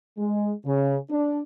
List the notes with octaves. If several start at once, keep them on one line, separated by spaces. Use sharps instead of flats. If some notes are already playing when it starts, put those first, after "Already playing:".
G#3
C#3
D4